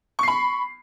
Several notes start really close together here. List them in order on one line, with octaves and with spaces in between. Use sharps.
C#6 C7 B5